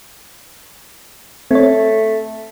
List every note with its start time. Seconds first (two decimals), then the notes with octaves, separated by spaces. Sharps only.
1.51 A3 C4 C#5